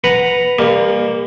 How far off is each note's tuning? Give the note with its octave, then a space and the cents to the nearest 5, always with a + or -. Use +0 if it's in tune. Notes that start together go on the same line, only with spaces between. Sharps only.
B4 +0 F#5 +0 A#5 +0
G3 +35 A#3 +0